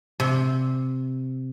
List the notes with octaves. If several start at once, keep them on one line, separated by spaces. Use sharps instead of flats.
C3